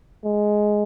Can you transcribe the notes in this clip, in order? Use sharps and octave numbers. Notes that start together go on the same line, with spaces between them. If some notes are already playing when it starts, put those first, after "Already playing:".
G#3